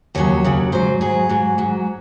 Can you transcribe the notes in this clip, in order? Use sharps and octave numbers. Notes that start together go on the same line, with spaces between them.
D#2 C#3 F#3 C#5
D#2 C#3 F#3
G#2 F#3 C5
G#2 F#3 G#4
G#2 F#3
G#2 F#3